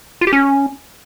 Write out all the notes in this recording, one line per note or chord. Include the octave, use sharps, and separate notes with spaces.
F4
G4
C#4